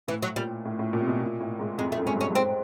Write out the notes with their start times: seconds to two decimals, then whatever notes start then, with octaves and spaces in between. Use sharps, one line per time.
0.08 A2 E3
0.22 F#3
0.36 A#2 G3
0.65 A2
0.79 A2
0.93 A#2
1.01 C3
1.07 B2
1.21 A#2
1.40 A2
1.59 G#2
1.78 F2 G#3
1.92 A3
1.97 F#2
2.06 G#2 C#4
2.15 G2
2.21 C#4
2.30 G2
2.35 G#2 C4